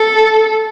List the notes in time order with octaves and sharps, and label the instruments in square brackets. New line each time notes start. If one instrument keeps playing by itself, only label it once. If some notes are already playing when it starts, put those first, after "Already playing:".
Already playing: [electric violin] A4